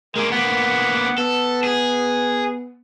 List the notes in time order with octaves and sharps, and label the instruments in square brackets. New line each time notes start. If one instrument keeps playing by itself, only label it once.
[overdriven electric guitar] G#3 A#3 [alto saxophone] A#4
[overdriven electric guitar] A#3 B3 [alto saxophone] F#5
[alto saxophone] B3 [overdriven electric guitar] A4
[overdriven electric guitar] G#4